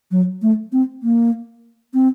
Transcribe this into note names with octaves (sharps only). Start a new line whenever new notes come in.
F#3
A3
C4
A#3
C4